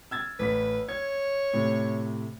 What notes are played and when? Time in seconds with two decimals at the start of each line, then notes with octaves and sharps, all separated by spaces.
0.11 E6 G#6 A6
0.39 A1 B4 B6
0.89 C#5 G#6
1.53 A2 C3